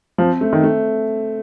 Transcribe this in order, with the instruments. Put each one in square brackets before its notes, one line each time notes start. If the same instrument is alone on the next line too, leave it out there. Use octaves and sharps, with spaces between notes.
[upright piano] F3 [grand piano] C4
[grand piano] A3
[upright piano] D#3
[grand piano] A3